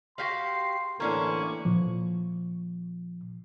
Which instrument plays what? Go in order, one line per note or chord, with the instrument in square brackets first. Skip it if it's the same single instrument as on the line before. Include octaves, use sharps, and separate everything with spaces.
[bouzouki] F#4 G4 F5 [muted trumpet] C6 [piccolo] C7
[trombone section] A2 D3 E3 [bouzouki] A#3 C#4 D4 [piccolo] C#6
[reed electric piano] A#2 F3